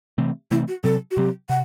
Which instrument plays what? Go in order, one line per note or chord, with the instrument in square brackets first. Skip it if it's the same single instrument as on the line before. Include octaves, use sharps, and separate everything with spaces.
[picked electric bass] C3 E3 A3 C4
[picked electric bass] C3 E3 A3 C4 [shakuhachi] E4
[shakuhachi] F#4
[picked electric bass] C3 F#3 C4 [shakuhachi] A4
[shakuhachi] F#4
[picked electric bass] C3 F#3 C4 [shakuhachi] G4
[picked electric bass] C3 [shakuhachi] F#5